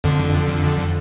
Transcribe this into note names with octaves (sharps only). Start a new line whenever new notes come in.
F2 D3